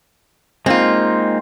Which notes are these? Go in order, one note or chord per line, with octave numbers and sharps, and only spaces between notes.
G#3 A#3 C4 D#4 F4